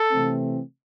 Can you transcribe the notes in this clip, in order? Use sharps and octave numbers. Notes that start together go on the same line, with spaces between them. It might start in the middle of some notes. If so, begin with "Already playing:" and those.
Already playing: A4
C3 E3 A3 C4